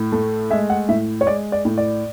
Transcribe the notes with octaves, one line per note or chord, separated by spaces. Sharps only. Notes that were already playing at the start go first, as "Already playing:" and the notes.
Already playing: A2
A3
G#3 E5
F#5
A2 E5
C#5
G#3 D5
D5
A2
D5